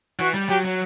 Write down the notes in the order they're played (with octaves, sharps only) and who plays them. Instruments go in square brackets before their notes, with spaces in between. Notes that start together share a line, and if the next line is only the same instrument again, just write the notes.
[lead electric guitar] E3 [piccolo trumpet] F#4
[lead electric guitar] G3
[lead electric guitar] F#3 [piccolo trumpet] G4
[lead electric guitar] F#3